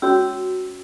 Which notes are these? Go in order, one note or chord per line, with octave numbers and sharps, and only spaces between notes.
C#4 F#4 C#5 E6